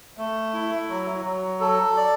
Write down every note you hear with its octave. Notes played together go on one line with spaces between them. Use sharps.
A3
E4
F#3
F#3
A4
D5